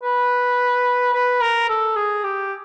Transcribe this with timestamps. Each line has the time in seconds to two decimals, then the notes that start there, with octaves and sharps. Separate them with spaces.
0.03 B4
1.13 B4
1.41 A#4
1.69 A4
1.96 G#4
2.24 G4